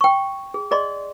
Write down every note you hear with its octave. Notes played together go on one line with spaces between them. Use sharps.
G5 C#6
G#4
G#4 D5 D#5 C6